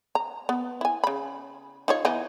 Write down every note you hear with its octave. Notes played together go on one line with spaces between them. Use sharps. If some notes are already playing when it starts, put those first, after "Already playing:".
A#5
B3
E4 G#5
C#3 B5
D#4 F4 C#5
E3 B3 D#4